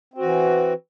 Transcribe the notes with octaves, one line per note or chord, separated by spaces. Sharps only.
E3 C4 F#4